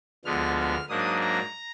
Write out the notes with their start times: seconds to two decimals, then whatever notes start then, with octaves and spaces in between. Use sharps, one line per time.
0.25 D2 D3 F3 G#3 B3 F6
0.57 F6
0.89 G#2 F#3 A#3 D4 D#6
1.21 A#5